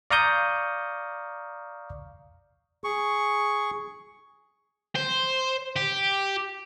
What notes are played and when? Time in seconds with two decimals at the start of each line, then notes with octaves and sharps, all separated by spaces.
0.11 D5 F5 A#5 C#6 D#6 G6
2.84 G#4 C#6
4.96 C5
5.76 G4